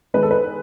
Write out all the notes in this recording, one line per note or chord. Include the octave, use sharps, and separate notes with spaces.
D#3 G#3 B3 B4
A4
B4